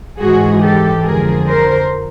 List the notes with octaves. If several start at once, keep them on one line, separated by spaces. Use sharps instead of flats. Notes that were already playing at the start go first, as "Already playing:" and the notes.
G#2 E3 G#3 F#4 G#4
G4 A4
F2 D3 F3 G#4 A#4
A#4 C5